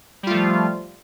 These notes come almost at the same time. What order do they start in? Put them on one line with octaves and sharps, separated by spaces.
G3 F4 A3 F3